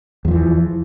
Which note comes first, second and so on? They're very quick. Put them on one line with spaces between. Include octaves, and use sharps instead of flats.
E2 F3 E3